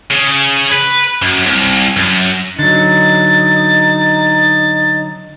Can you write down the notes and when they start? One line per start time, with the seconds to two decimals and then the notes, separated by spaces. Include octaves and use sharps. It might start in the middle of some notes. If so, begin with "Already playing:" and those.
0.11 C#3
0.72 B4
1.22 F#2
1.46 C2
1.97 F#2
2.59 D3 F#3 D#4 A6